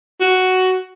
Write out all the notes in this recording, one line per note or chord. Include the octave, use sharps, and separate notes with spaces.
F#4